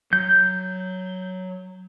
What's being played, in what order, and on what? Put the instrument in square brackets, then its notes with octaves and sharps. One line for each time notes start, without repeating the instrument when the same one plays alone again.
[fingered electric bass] F#3 [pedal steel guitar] G6